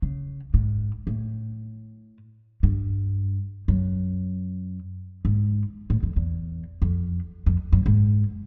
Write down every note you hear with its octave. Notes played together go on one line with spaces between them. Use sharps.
C#3
G#2
A2
G2
F#2
G#2
A2
F2
E2
F2
F2
F#2
G#2